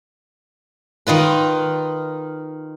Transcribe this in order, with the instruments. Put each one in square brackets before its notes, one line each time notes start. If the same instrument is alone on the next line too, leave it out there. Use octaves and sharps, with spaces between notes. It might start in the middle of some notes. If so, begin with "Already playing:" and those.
[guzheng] D#3 D#4 F4 B4